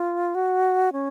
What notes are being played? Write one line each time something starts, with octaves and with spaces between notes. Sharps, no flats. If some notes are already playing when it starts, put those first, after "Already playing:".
Already playing: F4
F#4
C#4